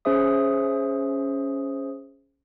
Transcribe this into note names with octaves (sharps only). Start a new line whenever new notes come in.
C#4 G#4 C5 E5 D#6